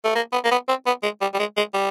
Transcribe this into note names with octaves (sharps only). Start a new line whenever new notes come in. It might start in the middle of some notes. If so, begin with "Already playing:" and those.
A3
A#3
B3
A#3
B3
C4
B3
G#3
G3
G3
G#3
G#3
G3